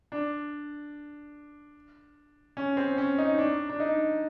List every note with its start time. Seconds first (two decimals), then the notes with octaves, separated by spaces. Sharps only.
0.12 D4
2.57 C#4
2.77 C4
2.98 C#4
3.18 D#4
3.38 D4
3.70 D4
3.80 D#4